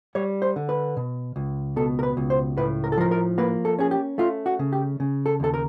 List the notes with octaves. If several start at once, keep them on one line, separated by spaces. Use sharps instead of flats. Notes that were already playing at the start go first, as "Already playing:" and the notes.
G3 C#5
C5
D3
B4
B2
C#2
B2 A4
A#4
B4
C#2
C5
A2 B4
A#4
A4
F3 A#4
A#4
A#3 B4
A4
C#4 G#4
G4
A3 F4
F#4
C#3
G4
C#3
A4
D#2 A4
A#4